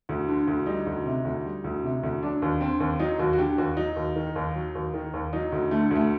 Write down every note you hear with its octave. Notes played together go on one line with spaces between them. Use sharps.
D2
D3
D2
G3 D#4
D2
C3
D2
G3
D2
C3
D2
F#3 D4
D#2
D3 C4
D#2
F#3 D#4
D#2 F#4
F#4
D3 G4
D#2 F#4
F#3 D#4
D#2
D#3
D#2
F#3
D#2
D#3
D#2
F#3 D#4
D2
D3 A3
D2 A3